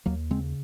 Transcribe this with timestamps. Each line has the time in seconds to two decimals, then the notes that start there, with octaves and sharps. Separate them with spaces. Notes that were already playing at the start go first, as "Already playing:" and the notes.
0.06 D#2 F#3 A#3
0.30 C#3 G#3 C4